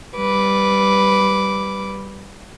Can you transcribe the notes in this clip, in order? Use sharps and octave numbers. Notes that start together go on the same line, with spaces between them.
G3 B4 D6